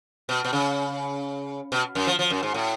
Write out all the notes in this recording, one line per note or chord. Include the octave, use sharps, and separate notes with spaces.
B2
B2
C#3
B2
F#2
F3
F3
F#2
G#2
A2